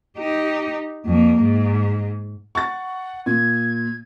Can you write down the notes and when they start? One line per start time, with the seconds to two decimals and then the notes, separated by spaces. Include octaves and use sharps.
0.17 D#4 G4
1.06 F2 A#3
1.41 G#2
2.55 F#5 C#6 A6
3.26 A#2 G#6